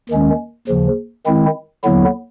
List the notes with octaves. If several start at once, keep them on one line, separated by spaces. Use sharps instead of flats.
D#2 D#3 G#3 C#4
D#2 C#3 F3
D#3 G#3 C4 E4
D#2 D3 F#3 B3 E4